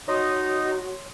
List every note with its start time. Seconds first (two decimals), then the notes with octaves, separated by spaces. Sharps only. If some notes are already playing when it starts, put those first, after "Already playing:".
0.08 D#4 F#4 C#5 D#5 C6 D#6